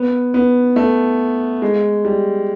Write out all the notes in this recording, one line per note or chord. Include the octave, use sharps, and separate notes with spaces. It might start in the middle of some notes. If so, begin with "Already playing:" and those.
Already playing: B3
B3
A3
G#3
G3